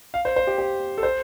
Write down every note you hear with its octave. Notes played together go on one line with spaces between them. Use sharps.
F5
C5
C5
G4
G4
A4
C5